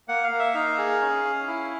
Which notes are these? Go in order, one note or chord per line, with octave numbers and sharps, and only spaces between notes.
A#3 F#5
F5
A#3
E5
D#4 F5
G#4
C#4
C#4
E4